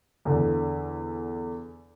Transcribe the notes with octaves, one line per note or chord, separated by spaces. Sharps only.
E2 D3